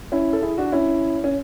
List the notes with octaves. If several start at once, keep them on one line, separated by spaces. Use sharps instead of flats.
C#4 E4
A4
E4 G#4
D4 F#4
C#4 E4
C#4